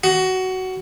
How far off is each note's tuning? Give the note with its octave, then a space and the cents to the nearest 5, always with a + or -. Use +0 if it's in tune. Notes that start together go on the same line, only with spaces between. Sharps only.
F#4 +15